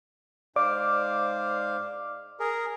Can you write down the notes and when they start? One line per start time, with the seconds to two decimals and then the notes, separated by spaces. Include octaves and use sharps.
0.56 G#2 C5 D5 F5 D6
2.40 G#4 A#4